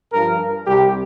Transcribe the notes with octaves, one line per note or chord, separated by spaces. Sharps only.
G2 F3 A#4
C2 C3 G3 G4